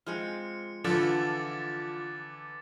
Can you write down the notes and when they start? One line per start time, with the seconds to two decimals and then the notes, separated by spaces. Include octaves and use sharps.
0.07 F3 G#3 C4 F6 C#7
0.84 D3 E3 F3 A4 D6 A6